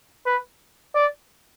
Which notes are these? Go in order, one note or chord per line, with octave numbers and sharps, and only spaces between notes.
B4
D5